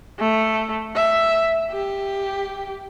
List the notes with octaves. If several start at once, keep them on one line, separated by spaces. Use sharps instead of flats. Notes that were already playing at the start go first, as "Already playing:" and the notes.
A3
E5
G4